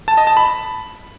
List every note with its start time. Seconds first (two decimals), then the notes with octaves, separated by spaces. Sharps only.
0.08 A5
0.17 D#5
0.27 A5
0.37 B5